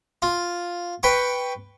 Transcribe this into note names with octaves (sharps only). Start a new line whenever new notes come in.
F4
B4 G5 C#6